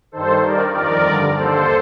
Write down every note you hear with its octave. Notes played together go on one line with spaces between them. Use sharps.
G2 D#3 A4 C5
G2 D#3 A#4 D5
F2 D#3 A#4 D5
G2 D3
D#2 D3 A4 C5